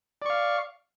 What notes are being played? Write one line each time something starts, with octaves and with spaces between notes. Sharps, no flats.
D5 F5 C#6